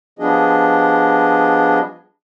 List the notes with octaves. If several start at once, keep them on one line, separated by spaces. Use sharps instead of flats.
F3 G3 B3 D4 G#4 D#5